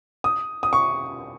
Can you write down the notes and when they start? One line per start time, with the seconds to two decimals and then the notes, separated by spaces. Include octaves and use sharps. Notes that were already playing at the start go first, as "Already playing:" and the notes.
0.24 D#6
0.63 D#6
0.73 C#6